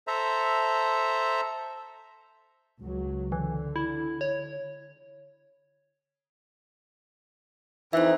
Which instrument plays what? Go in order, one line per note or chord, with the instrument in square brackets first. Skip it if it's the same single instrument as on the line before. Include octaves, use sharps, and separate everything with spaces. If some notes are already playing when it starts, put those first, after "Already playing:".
[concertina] A4 C5 E5 A#5
[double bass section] C#2 F#3
[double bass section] D3 [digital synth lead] E3
[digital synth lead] E4
C#5
[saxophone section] F2 E3 [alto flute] D#4 [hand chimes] C5 E5